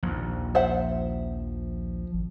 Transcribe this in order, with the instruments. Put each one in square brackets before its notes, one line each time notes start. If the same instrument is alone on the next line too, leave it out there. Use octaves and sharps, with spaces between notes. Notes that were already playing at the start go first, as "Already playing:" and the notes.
[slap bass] A#1 D#2 [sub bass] F3
[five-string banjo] C5 E5 F#5
[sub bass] G#1